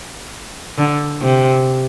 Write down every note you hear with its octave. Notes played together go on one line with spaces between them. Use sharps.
D3
C3